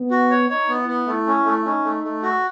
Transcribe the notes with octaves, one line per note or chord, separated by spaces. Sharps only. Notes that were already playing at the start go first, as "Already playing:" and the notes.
Already playing: B3
F#4
C#5
D#4 C#5
B3
E4
B3
A3 E4
C#4
A3
C#4 D#4
A3
A3
F#4